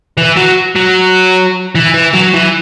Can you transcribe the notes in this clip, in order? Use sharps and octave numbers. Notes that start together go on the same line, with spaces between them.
E3
F#3
F#3
E3
E3
F#3
E3